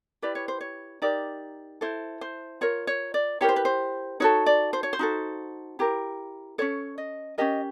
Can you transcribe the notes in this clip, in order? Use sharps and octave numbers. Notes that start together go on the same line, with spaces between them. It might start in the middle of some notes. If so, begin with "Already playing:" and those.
E4 G4 B4 D5
C#5
C5
C#5
D#4 G4 A#4 D5
E4 A4 C5
C5
F4 A#4 C#5
C#5
D5
E4 G4 A#4 C#5
C5
B4
C5
D#4 F#4 A4 C#5
D5
C5
C#5
C5
D#4 F#4 A4
E4 G4 A#4
C#4 F4 A4 C#5
D#5
C#4 E4 G4 A#4 D#5